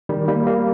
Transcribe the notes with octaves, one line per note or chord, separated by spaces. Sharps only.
D#3 G3
G3 A#3
G3 A#3